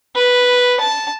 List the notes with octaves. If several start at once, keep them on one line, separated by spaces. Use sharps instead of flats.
B4
A5